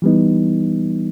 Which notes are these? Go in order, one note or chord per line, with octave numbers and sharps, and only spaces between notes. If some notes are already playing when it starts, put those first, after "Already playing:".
E3 G3 B3 D#4